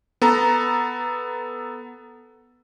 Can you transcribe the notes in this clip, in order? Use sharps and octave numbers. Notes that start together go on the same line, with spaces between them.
B3 A4 A#5